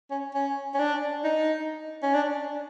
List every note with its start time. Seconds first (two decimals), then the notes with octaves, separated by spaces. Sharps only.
0.11 C#4
0.34 C#4
0.74 C#4
0.79 D4
1.24 D#4
2.03 C#4
2.14 D4